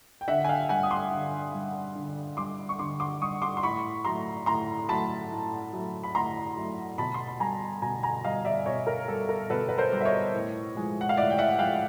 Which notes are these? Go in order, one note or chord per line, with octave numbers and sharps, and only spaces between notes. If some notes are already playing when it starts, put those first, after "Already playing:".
G5
D3 E5 F#5
G#5
F5 G5
G3 F#5 G#5
D#6
C6 D6
D3
G3
D3
G3 C6 D6
C#6
D3 C6 D6
C6 D6
G3 C#6 D#6
C6 D6
C6
A2 B5 C#6
F#3 A3 A#5 C6
A2 A#5 C6
F#3 A3 A5 B5
A2
F#3 A3
B5
A2 A#5 C6
F#3 A3
B2 A5 B5
C6
B5
G3 G#5 A#5
B2 G#5 A#5
G#5 A#5
G3 D#5 F5
D5 E5
B2 C#5 D#5
A#4
G3 A4
A#4
B2 A4 B4
B4
A#4 C5
G3
E5
C#5 D#5
A2
F3 G#3
F#5
F5
A2 D5 E5
G5
E5 F#5
F3 G#3 F5 G5